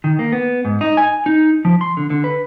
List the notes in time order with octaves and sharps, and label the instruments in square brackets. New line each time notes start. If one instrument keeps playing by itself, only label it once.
[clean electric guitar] D#3
A#3
B3
G#2
D#4
G#5
D#4
F3
C6
D3
D3
B4